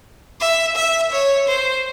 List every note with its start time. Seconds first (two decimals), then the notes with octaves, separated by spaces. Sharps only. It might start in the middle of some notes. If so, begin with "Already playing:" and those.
0.41 E5
0.76 E5
1.12 C#5
1.48 C5